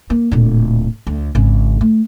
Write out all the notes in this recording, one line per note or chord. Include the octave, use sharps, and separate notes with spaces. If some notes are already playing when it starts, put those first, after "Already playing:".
A#3
D1 A#2
D2
G#1 C#3
A3